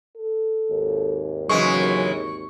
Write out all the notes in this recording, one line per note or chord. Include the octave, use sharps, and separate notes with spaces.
A4
G#1 D#2
C#3 E3 F#3 G#3 C#6